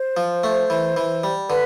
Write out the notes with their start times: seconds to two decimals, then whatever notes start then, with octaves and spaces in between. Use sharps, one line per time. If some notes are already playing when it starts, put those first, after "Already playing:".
Already playing: C5
0.17 F3
0.44 A3
0.70 E3
0.97 E3
1.24 G3
1.50 D3 B4